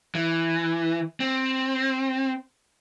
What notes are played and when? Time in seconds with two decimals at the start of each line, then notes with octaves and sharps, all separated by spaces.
0.15 E3
1.20 C4